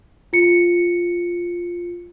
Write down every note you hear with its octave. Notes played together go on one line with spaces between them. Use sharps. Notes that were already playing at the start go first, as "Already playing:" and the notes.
F4 C#7